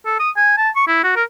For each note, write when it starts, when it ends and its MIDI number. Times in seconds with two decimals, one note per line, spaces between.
0.06 0.17 69
0.19 0.30 87
0.36 0.53 80
0.57 0.69 81
0.76 0.86 85
0.87 1.02 64
1.04 1.13 66
1.16 1.23 70